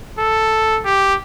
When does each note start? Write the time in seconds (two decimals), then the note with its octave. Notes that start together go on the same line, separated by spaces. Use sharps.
0.18 A4
0.85 G4